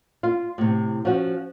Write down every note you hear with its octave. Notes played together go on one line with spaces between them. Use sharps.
F4
A2 C3
F3 C#4 F#4